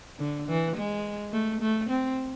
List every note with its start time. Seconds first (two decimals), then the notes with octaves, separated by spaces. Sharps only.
0.19 D3
0.48 E3
0.76 G#3
1.32 A3
1.61 A3
1.90 C4